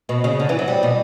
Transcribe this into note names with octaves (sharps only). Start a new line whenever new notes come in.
B2
C#3
D3
E3
F#3
G3
B2